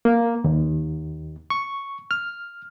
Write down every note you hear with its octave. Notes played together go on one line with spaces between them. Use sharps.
A#3
D#2
C#6
F6